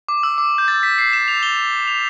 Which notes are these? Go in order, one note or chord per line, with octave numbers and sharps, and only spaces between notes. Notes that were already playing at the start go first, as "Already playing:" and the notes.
D6
E6
D6
G6
A6
B6
C7
E7
F7
G7
F7